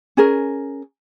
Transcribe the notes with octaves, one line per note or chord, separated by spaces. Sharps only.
C#4 G#4 A#4